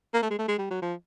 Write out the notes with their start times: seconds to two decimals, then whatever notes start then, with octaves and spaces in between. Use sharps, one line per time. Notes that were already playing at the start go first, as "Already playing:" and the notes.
0.14 A#3
0.22 A3
0.30 G#3
0.38 A3
0.48 G#3
0.58 G3
0.70 F#3
0.82 F3